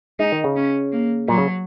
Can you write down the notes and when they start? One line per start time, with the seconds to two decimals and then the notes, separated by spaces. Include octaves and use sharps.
0.19 G#3 D#4
0.32 D#3
0.44 C#3
0.56 C#4
0.92 A#3
1.28 A#2 F#3
1.38 C#3